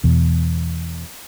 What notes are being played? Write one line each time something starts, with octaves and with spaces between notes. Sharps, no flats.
E2 B2